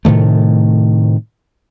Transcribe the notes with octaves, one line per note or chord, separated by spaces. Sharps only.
A2 C3 D#3 A3